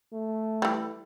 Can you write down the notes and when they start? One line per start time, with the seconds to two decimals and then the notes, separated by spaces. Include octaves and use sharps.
0.13 A3
0.62 E3 G3